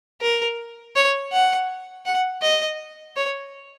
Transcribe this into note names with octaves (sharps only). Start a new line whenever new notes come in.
A#4
C#5
F#5
F#5
D#5
C#5